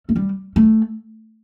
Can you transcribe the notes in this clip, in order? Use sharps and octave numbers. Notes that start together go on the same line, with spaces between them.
A3
G3
A3